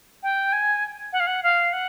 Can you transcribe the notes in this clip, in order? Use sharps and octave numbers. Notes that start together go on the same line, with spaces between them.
G5
G#5
F#5
F5
F#5
F5
F#5